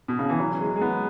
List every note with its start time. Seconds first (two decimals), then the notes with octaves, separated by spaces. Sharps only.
0.08 B2
0.19 C#3
0.29 E3
0.40 F#3
0.61 G#3
0.76 G#3
0.81 B3